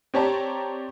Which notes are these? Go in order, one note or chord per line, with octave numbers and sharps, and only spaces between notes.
C4 G4 C#5 D5 A5 A#5